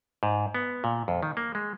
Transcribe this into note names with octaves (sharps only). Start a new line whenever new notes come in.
G#2
B3
A#2
F2
D#3
A#3
G#3